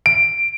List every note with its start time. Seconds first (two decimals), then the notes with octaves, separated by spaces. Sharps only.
0.06 D7